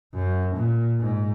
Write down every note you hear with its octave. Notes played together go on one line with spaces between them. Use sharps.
F#2
A#2
G#2